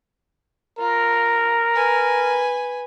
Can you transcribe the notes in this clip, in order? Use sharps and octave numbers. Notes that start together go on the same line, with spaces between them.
F4 A#4
B4 G#5